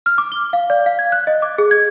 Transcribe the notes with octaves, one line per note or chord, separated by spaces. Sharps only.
F6
D6
G7
F5
D5
F5
G#6
F#6
D#5
D6
G#4
G#6